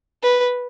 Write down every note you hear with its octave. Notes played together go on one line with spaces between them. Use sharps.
B4